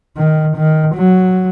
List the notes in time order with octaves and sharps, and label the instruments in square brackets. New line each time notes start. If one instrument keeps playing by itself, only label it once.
[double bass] D#3
D#3
F#3